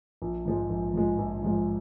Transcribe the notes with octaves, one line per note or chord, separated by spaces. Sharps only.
A#1
G#2 F3 G#3
A#1
G#2 F3 G#3
A#1
G#2 F3 G#3